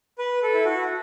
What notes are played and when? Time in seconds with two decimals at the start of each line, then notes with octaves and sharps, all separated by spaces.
0.18 B4
0.43 A4
0.54 E4
0.65 F#4